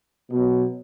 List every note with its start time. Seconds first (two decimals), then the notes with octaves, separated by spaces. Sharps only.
0.31 B2 F#3